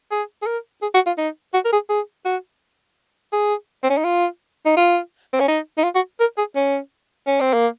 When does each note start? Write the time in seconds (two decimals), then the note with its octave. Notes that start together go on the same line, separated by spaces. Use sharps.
0.11 G#4
0.42 G#4
0.46 A#4
0.82 G#4
0.94 F#4
1.06 F4
1.18 D#4
1.54 F#4
1.65 A#4
1.72 G#4
1.89 G#4
2.25 F#4
3.33 G#4
3.83 C4
3.90 C#4
3.98 D#4
4.04 F4
4.66 D#4
4.76 F4
5.33 C4
5.40 C#4
5.48 D#4
5.78 D#4
5.84 F4
5.95 F#4
6.20 A#4
6.37 G#4
6.56 C#4
7.27 C#4
7.41 C4
7.53 A#3